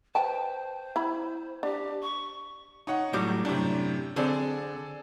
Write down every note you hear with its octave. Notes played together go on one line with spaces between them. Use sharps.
B4 C5 G5 A5
E4 B5
D4 G4
C#6
D#4 C#5 F#5
A2 F#3 G3 C#6 D6 G6
F#2 A2 C3 D4
D3 C4 D4 G#4 A4 D5